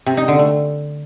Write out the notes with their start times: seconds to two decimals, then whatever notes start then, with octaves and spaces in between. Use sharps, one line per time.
0.06 C3
0.17 D#4
0.28 D3
0.39 A3